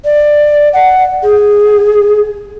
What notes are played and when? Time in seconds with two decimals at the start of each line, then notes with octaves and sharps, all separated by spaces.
0.05 D5
0.73 F#5
1.23 G#4